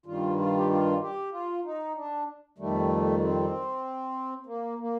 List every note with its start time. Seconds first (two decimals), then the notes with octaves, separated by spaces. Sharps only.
0.06 G2 D#3 G3 F4
0.38 F4
0.57 G4
0.70 F4
1.01 G4
1.32 F4
1.64 D#4
1.95 D4
2.58 F2 D#3 G3 A3
3.21 C4
4.46 A#3
4.78 A#3